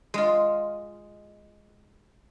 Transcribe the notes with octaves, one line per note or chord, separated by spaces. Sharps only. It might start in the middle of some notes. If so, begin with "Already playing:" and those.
G#3 F4